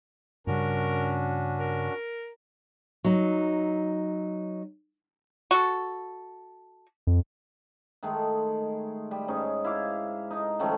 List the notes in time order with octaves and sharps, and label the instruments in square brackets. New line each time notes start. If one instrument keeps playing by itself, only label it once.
[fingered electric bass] G2 C#3 G3 [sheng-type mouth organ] C#4 D4 F#4 [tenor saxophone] A#4
[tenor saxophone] A#4
[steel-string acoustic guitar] F#3 D#4
[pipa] F#4 A4
[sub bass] F2
[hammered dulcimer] D#3 G#3 A3
G3
G#2 C#4 D#4
E4 F5 D6
D#4 A#4
D#3 F3 A3 C#4